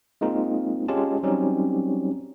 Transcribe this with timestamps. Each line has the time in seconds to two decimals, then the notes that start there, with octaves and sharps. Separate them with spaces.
0.21 G#3 A#3 C4 D#4 F4
0.88 G#3 C#4 F4 G4 A5
1.23 F#3 G3 C4 C#4 D#4 G4